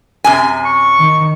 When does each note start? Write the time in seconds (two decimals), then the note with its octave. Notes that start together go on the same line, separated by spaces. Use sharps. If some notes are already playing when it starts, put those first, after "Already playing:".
0.24 F#2 C3 G#5
0.65 C#6
0.99 D#3